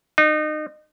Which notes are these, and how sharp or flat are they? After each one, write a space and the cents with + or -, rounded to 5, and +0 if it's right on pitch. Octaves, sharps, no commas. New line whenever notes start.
D#4 -30